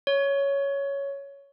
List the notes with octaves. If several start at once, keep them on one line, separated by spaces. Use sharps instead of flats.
C#5